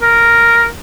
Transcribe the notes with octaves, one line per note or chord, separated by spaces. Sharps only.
A#4